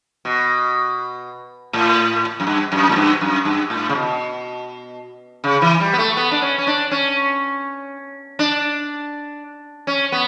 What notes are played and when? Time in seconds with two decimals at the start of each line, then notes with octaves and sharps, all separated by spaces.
0.25 B2
1.73 A2
2.40 F#2
2.47 G2
2.72 F#2
2.89 A2
2.96 G2
3.21 F#2
3.45 G2
3.70 A2
3.89 C#3
3.95 B2
5.44 C#3
5.62 E3
5.80 G3
5.93 B3
5.98 A3
6.17 B3
6.31 D4
6.42 C#4
6.58 C#4
6.67 D4
6.91 C#4
8.39 D4
9.87 C#4
10.12 B3